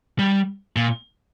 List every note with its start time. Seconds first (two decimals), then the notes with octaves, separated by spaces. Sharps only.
0.19 G3
0.76 A#2